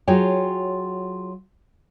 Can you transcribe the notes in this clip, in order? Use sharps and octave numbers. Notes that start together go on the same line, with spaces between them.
F#3 F4 F#4 G#4 C#5 G5